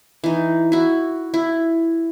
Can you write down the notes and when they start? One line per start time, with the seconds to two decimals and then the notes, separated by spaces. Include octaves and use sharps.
0.24 E3 D#4
0.72 E4 F#4
1.34 E4